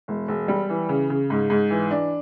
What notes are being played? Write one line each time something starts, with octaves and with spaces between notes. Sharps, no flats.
E1
E1
G3
E3
C#3
C#3
G#2
G#2
E3
D4